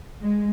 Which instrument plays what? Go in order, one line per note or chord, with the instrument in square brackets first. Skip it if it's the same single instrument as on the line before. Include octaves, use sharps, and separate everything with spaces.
[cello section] G#3